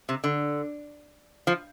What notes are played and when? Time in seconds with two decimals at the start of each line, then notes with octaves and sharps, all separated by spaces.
0.09 C3
0.24 D3
1.47 F3